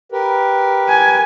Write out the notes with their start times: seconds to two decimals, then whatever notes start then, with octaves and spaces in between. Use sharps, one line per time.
0.12 G4 A#4 B4
0.89 G#5